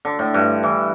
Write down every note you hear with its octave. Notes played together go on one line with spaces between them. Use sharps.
D3
A2
G2
E3